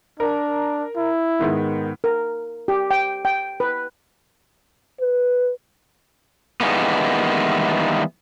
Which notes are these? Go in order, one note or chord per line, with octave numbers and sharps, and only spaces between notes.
D4 A#4
E4
G#2 D#3 B3
A#4
G4
G5
G5
B4
B4
D#3 E3 G3 G#3 A#3 B3